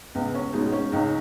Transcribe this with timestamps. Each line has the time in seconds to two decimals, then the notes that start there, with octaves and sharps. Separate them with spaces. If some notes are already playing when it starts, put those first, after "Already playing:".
0.15 C#2 B3
0.35 C#4
0.53 B2 G#3 D#4
0.72 C#4
0.92 C#2 D#4